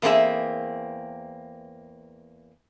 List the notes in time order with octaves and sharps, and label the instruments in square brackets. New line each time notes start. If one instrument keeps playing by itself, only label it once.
[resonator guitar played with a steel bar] E2 A#3 C4 D4 G#4 E5